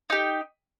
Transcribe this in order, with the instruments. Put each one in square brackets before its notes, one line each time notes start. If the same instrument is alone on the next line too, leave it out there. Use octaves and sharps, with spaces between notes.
[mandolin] D#4 G4